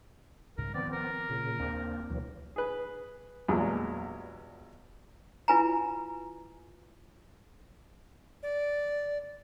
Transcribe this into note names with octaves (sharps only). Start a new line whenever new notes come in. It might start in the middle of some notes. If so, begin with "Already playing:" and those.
C2 G#2 C#3 A#4
D#3 F3 B3 C4 D5
A#4
A#2 C#3
D#2 A#3 C4 D4
D2 B2 E3 F#3
G#4 B4
E2 G2 A#2 F#3 G#3
E4 F4 B4 G#5 A#5
D5